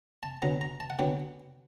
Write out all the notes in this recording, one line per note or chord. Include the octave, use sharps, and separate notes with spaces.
A5
D3 F#3 B3 A#5
A#5
A5
F#5
D3 F#3 B3 G5